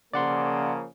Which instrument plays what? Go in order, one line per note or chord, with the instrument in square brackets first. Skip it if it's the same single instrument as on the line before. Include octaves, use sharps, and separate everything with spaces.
[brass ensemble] C#3 F3 A#3 [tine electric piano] D5 F#5 C6